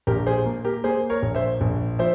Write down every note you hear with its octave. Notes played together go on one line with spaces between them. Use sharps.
A#1 G4 A#4
G#4 C5
A#3
G4 A#4
A#3 G#4 C5
A#4 C#5
A#1
C5 E5
A#1
F3 C5 E5